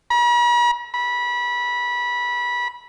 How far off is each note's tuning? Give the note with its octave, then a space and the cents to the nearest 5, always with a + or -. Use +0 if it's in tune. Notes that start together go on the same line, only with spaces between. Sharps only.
B5 -45
B5 -20